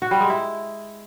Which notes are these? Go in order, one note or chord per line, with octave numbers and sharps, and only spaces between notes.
F#4
G3
G#3
E4